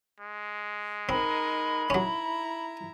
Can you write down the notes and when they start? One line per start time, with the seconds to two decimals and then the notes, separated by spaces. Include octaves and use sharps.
0.20 G#3
1.09 C4 D#4 A#4 B5
1.90 F#3 C#4 E4 A#5